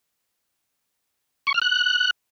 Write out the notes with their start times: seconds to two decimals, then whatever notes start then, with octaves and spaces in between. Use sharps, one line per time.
1.47 C#6
1.54 F6
1.62 F#6